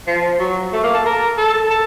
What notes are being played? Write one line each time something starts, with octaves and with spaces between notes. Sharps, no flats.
F3
F#3
A3
A#3
A4
A#4
A4
A4